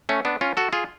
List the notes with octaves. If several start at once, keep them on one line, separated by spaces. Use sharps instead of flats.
A3 C#4
B3 D4
C#4 F4
F#4 A4
F4 G#4